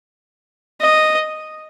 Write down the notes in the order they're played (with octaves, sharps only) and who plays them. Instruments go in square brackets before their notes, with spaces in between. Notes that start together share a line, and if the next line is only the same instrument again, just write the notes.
[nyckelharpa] D#5